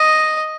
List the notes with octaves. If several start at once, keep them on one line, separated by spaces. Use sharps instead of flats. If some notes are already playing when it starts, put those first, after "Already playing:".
Already playing: D#5